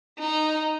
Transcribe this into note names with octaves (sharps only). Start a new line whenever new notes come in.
D#4